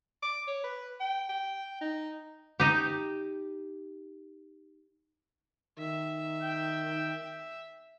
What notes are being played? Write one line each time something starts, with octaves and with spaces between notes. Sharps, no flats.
D6
C#5
B4
G5
G5
D#4
D#4 G4
D#3 E5
G5